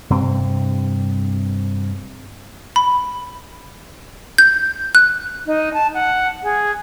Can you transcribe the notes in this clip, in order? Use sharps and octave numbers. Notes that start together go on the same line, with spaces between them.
G2 C3 C4
B5
G6
F#6
D#4
A5
F#5
G#4